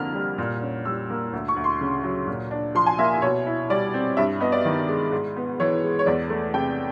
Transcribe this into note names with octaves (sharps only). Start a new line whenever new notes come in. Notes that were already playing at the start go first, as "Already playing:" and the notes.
Already playing: F2 D3 A#3 F6
G3
A#2
C#4
G3 E6
A#3
D2
C#6
D2
C6
C#3
F#3
A#2
D4
F3 C6
G#5
A#3 E5
B2 C#5
E4
G3 D5
C4
G2 E5
B3 D#5
D5
D#3
G#3
G#2
B3
E3 C#5
G#3
C#5
E2 D5
A3
C3 G5